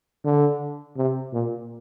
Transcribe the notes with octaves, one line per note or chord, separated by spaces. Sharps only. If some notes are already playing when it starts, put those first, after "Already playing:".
D3
C3
A#2